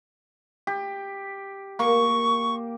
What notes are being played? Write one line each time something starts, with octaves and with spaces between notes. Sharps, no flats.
G4
A#3 C#6